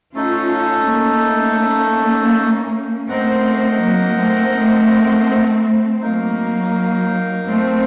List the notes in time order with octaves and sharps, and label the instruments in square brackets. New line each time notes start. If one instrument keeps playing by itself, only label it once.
[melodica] A3 D#4 A4 [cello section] C#4 F4
[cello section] A#3 C#4
[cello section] A3 C4 [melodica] D#4 A#4 D#5 F#5
[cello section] F#3 A#3
A3 C4
[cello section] F#3 A#3 [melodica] D#4 A#4 F5
[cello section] A3 C4